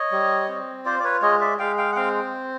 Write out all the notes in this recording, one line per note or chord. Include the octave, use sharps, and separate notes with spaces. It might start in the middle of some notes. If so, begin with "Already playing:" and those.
Already playing: C#5 D#5
G3
C4
F4 C5 D5
D5
B4 C#5
G#3 C#5 D#5
D5 E5
G#3 F5 G5
F5 G5
F#5
C4 F5 G5